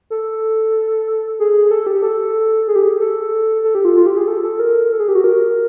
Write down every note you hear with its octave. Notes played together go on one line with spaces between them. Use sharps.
A4
G#4
G#4
A4
G4
A4
G#4
G4
G#4
A4
A4
G4
F4
F4
G4
G#4
A4
A4
A#4
A4
G#4
G4
F#4
A#4